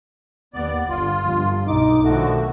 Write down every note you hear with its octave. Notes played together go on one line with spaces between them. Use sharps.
D#2 B3 D5
G1 F4
G1 G2
B1 D#4 D6
B1 D3 D#3 F3 A3 F#4